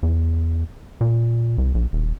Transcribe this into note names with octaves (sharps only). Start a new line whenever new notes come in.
E2
A#2
C2
A#1
D#1